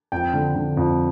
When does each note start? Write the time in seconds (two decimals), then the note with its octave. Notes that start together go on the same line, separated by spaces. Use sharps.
0.12 F2 G5
0.33 D3
0.55 D3
0.77 F2